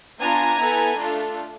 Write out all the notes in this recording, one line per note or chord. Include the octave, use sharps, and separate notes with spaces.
B3 D4 F4 G#5 A#5
B3 E4 A4
A3 D4 F4 A4